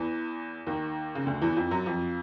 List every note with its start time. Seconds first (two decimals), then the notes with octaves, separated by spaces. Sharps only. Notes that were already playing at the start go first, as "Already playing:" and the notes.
Already playing: E2 E3
0.67 D#2 D#3
1.15 C#3
1.26 D2 D3
1.42 E2 E3
1.56 F2 F3
1.71 F#2 F#3
1.86 F2 F3